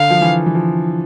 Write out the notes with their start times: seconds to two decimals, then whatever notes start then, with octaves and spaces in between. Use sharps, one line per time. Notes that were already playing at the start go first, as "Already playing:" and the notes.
Already playing: D3 F5
0.10 F3
0.21 E3
0.46 E3
0.55 F3